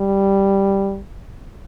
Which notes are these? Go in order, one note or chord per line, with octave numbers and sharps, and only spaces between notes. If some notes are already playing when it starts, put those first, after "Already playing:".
Already playing: G3